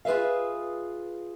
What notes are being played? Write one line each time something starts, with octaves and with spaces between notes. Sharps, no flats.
F4 G#4 B4 E5 F5